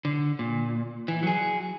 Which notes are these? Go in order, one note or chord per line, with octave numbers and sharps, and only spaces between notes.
D3
A#2
E3
F#3 G#4